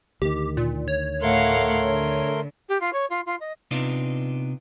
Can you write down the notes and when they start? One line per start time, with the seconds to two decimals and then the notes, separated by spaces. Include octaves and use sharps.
0.22 D2 D#3 G4
0.57 A#2
0.88 C#5
1.22 A2 A3 A#4 F5 F#5 C6
1.85 D3
2.68 G4
2.80 F4
2.92 C#5
3.09 F4
3.26 F4
3.40 D#5
3.71 C3 B3 D4 D#4 F4